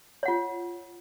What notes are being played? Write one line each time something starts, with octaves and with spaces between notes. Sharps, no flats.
F4 C#5 F#5